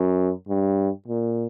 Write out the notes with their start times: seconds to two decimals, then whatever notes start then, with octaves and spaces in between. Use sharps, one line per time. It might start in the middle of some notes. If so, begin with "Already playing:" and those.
Already playing: F#2
0.49 G2
1.08 A#2